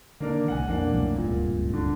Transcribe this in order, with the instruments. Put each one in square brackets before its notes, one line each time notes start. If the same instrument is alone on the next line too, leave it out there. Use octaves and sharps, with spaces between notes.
[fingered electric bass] D3 D#3 [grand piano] A#3 D4 A#4
[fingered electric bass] C2 A2 [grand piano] F#5 G#5
[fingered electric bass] B1 F2 [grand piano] A#3 D4 F#5
[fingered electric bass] C2 F#2 A2
[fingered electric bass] D1 C#2 G2 [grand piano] A#2
[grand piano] D3